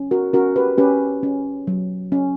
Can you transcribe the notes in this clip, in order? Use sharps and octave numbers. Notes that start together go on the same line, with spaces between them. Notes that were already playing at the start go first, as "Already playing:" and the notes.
Already playing: C#4
F#4 A#4
C#4 F#4 A#4
G4 B4
C#4 G4 B4
C#4
F#3
C#4